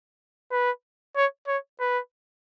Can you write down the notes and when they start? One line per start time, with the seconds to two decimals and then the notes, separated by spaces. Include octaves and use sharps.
0.51 B4
1.16 C#5
1.48 C#5
1.80 B4